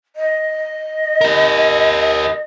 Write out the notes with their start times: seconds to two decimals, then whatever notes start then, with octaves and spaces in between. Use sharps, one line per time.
0.16 D#5
1.21 G4 A#4